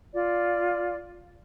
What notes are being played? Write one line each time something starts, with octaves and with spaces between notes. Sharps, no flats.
F4 D5